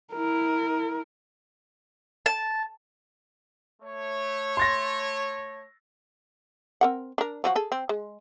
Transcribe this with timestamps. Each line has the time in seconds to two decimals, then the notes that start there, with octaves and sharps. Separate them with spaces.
0.13 E4 A#4
2.26 A5
3.82 A3 C#5
4.57 C6 A6 A#6
6.81 C4 A#4 F#5
7.18 D4 A#4
7.44 F3 F#3 F#4
7.56 G#4 A4
7.72 C4
7.89 G#3